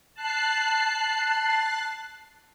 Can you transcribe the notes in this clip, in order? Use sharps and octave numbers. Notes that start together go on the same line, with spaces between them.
A5 F#6 C7